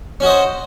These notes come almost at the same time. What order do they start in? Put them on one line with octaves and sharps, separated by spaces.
C#4 F#4 D#5 C5